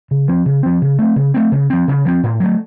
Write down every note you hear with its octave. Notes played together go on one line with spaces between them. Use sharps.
C#3
F3 C4
C#3
F3 C4
C#3
A3 C4
C#3
A3 C4
C#3
F3 C4
C#3
F3 C4
A2
F#3 A3